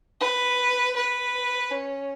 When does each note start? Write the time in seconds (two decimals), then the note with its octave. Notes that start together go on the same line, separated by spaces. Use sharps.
0.20 B4
0.96 B4
1.71 C#4